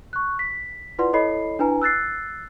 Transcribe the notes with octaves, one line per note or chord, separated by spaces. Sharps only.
C#6 F#6
B6
E4 F4 B4 D5 F#5 C6
E4 A4 C#5 D#5 B5 C7
D4 E4 B4 G#5 A#5
E6 F#6 A6 C7